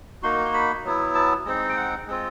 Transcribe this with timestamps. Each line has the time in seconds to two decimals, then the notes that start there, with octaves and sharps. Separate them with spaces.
0.22 A#3 D#4 F#4 C6
0.45 C6
0.54 B5
0.85 F#3 B3 E4
1.15 A5
1.46 G#3 C4 D#4
1.69 G5
1.77 F#5
2.08 G#3 C4 F4